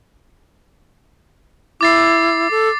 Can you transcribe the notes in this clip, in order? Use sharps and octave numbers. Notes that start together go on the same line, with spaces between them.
E4 D6 A6 C7
A4